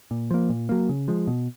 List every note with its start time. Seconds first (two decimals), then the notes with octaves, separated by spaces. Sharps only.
0.11 A#2
0.31 F3 A#3
0.50 A#2
0.69 F#3 A#3
0.89 C#3
1.08 F3 G#3
1.27 B2